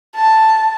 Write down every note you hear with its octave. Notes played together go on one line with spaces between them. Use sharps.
A5